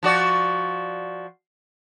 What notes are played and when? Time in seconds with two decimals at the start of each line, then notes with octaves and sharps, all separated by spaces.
0.03 F3 F#4 D5